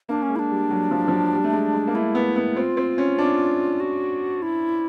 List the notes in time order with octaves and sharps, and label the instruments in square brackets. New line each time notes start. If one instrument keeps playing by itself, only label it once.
[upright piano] A#3 [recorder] D4
[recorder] C#4
[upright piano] G#3
[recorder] E4
D4
[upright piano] G3
F#3
F3
F3
F#3
G3
A3
G#3
G#3
A#3
[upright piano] A3 [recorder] E4
[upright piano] B3
B3
[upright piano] C4 [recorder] F4
[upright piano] C4
C#4
D4
[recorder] F#4
E4